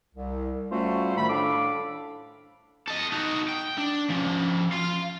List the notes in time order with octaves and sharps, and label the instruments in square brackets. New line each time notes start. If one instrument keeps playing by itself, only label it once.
[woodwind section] C2
G3 A3 C#4 F4 F#4 C5
A2 D#3 A3 B5
A2 D4 A4 F5 D6
[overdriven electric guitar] A4 D#5
D#4 F#4
G5
D4
F3 C#4
F5 C6